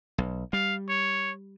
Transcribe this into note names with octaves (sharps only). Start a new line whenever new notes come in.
B1
G3 F5
C#5